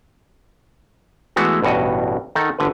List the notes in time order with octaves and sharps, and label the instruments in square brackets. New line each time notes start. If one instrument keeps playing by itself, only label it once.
[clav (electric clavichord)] E3 G#3 A3 B3 F#4
A1 G2 B2 F#4 D#5
D#3 D#4 A4 F#5
G1 D3 B4